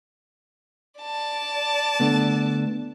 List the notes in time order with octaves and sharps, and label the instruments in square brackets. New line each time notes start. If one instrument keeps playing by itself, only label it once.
[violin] D5 A5
[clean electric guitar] D3 A3 B3